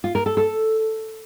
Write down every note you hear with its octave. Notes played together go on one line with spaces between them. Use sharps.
F4
A#4
A4
A4